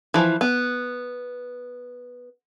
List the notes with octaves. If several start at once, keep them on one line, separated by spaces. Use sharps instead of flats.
E3 F3
B3